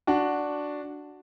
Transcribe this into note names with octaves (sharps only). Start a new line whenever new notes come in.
D4 F#4